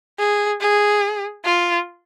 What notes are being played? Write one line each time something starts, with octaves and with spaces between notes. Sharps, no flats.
G#4
G#4
F4